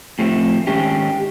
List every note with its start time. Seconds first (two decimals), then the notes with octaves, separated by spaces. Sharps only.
0.19 A2 F3 A3 C4
0.67 G#2 D#3 G#3 C#4 G4